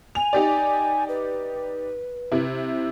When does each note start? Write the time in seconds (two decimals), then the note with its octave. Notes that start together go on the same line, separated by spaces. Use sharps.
0.15 G#5 F7
0.33 D#4 G4 D5
1.08 B4
2.32 C3 E4